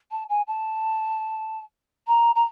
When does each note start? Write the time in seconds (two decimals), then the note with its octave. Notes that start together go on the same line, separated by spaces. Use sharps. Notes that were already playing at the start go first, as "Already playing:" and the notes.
0.11 A5
0.29 G#5
0.47 A5
2.07 A#5
2.35 A#5